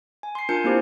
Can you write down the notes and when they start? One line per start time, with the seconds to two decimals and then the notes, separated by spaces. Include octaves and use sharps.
0.23 G#5
0.35 C6 C7
0.49 D4 F4 A#4 G#5 G6 C#7
0.64 A#3 C4 D4 E4 G4 C5